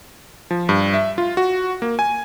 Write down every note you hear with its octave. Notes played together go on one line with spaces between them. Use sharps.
F3
G2
E5
F4
F#4
A#3
G#5